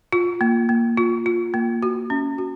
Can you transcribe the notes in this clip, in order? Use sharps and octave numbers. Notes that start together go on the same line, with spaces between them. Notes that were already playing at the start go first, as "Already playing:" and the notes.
F4
A#3
A#3
F4
F4
A#3
F#4
C#4
F#4